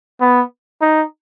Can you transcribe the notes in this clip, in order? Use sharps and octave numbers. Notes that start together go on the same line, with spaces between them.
B3
D#4